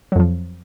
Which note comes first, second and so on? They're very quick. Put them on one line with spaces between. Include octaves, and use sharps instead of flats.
F#3 F2 F3